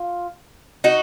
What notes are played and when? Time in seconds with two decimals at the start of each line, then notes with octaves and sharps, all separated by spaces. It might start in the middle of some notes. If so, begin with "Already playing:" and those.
Already playing: F4
0.84 D#4 F#4